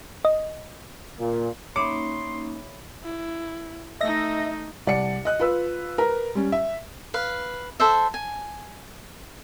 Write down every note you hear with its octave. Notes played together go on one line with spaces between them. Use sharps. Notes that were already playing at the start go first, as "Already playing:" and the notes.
D#5
A#2
A#3 C#4 D#4 C#5 E5 B5 C6 D6
E4
A3 D#4 D#5 E5 A#6
C2 D5 F#5 C#7
D#5 F#6
F4 B4 E6
A#4 B4 A#5
G3 C#4
E5
B4 F5
A4 C5 E5
G#5